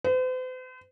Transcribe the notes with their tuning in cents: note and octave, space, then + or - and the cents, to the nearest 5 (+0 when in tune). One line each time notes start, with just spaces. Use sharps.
C5 -45